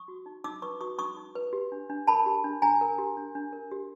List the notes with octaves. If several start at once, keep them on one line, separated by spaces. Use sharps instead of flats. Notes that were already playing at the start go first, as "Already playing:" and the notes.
Already playing: C#6 D#6
F#4
D#4
D#4 D6 E6
B4 C#6 D#6
F#4 C#6 D#6
D#4 C#6 D#6
D#4
B4
G4
D4
D4
A#4 A5 B5
G4
D4
D4 G#5 A#5
A#4
G4
D4
D4
A#4
G4